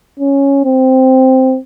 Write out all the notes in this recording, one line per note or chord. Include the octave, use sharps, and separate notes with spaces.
C#4
C4